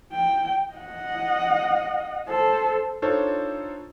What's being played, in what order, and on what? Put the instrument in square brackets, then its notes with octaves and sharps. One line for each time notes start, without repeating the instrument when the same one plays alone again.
[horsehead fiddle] G5
D#5 F#5
A4 C5
[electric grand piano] D4 D#4 F4 A4 C5 C#5